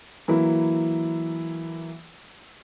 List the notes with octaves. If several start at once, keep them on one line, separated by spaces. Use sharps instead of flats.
E3 F#3 A#3 E4